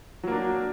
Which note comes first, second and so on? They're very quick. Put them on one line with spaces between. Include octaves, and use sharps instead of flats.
F#3 A#3 D4